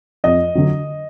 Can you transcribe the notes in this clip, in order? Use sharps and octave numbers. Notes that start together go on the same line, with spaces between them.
F2 D#5
D3 F#3